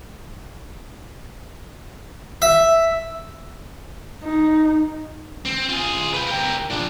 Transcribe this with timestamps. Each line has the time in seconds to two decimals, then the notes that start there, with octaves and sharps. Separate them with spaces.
2.42 E5
4.23 D#4
5.45 C4
5.69 F4 G#4
6.14 B4 G5
6.27 G4 A#4
6.70 F3 D4